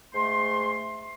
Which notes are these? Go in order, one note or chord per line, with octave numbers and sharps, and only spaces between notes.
G#2 A3 C6